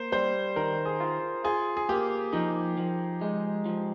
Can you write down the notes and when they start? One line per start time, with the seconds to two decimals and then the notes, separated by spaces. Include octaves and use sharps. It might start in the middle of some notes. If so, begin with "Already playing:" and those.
Already playing: A#3 C5
0.12 G3 C5
0.56 D#3 A#4
0.85 G#4
1.00 F4
1.44 F4 G#4
1.77 G#4
1.89 A#3 G4
2.33 F3 D#4
2.78 F3
3.21 G#3
3.66 F3